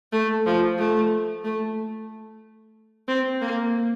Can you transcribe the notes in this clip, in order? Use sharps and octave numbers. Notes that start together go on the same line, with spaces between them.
A3
F3
A3
A3
C4
A#3